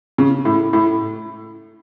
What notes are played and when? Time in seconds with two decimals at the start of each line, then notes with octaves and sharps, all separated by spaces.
0.18 C#3
0.45 A2
0.73 A2